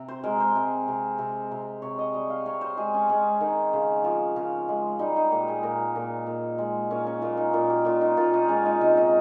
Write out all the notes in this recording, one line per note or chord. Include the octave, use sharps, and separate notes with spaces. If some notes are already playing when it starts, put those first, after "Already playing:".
Already playing: C3
C5
G#3 A#4
C5
C3
C3
C3
C3
C3 C#5
D#5
G3
F5
C3 C#5
C5
G#3 G#4
C#4
G#3 C#4
D#3
C#3
F3
C#3
G#3
G3 D#4
D#4
A#2 G4
G#4
A#2 A#4
A#2
A#2
G#3
A#2 C#4
C#4
A#2 F4
D#4
A#2 F4
G4
A#2 F4
D#4
A#2 F4
D#4
G#3 C#4
D#4
C3 D#4
D#4